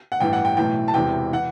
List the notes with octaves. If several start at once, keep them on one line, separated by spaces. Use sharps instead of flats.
F#5
A1 G2 E3 G5
F#5
G5
B1 A2 E3 G5
A5
E1 E2 C3 E3 G5
E3 F#5